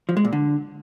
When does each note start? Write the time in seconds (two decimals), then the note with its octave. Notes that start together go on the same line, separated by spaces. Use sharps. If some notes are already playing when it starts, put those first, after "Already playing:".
0.09 F3
0.17 G#3
0.25 A#2
0.33 D3